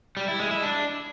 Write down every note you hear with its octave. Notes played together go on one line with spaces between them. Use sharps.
G3
E4
G#3
E4
D4